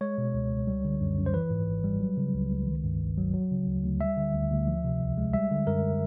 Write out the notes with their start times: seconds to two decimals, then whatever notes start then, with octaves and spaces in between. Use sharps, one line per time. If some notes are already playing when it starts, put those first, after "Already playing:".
0.01 G#3 C#5
0.18 B2
0.34 C#2
0.50 C#2
0.67 G3
0.85 D3
1.01 F#2
1.17 F#2
1.26 C5
1.33 E3 B4
1.50 G#2
1.68 G#1
1.84 G3
2.00 F#3
2.17 C#3
2.34 C#2
2.51 C#2
2.67 D#3
2.84 G2
3.01 G1
3.17 F#3
3.34 F#3
3.51 C#3
3.67 D2
3.84 D2
4.00 G3 E5
4.17 D3
4.34 D2
4.51 D2
4.68 F3
4.84 C3
5.01 C2
5.18 G#3
5.34 G3 E5
5.51 D3
5.67 F#2 A#4